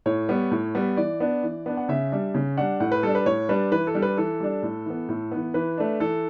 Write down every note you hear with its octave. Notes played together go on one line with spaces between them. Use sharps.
A2 C#5
G3 B3
A2
G3 B3
E3 D5
B3 D4
E3
B3 D4
F#5
C#3 E5
G3 D4
C#3
G3 D4 F#5
A2 F#5
B4
G3 D4 A4
B4
A2 C#5
G3 D4 B4
E3 B4
A4
G3 D4
B4
E3 A4
G3 D4
A2
E3 B3
A2
E3 B3
E3 B4
A3 D4
E3 A4